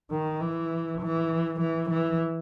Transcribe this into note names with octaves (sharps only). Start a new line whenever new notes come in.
D#3
E3
E3
E3
E3